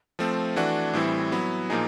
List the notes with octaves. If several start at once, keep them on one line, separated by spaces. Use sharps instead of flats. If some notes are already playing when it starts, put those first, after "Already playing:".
F3 A3 C4
E3 A3 D4 F#4
A2 E3 G3 C4 E4
F#3 B3 E4
A#2 F3 A#3 D#4 G#4